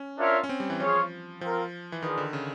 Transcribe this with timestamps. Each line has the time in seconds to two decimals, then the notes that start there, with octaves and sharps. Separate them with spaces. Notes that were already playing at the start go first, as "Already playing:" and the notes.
Already playing: C#4
0.18 D4 F4 A#4 C#5 E5
0.43 C#4
0.49 C4
0.60 G3
0.70 E3
0.80 F3 C#4 F4 G#4 C#5
1.41 F3 C4 F4 A#4
1.92 E3
2.02 D#3 D4 F4 G#4 B4 D#5
2.18 D3
2.33 C#3